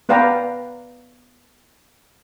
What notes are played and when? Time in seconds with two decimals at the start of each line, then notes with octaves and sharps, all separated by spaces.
0.09 B3 B4 D5 F5 G5 A#5